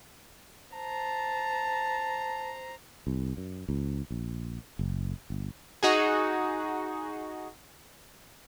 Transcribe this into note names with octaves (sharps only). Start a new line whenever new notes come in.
C5 A5 A#5
C2
F#2
C#2
A#1
F#1
G1
D#4 F#4 G#4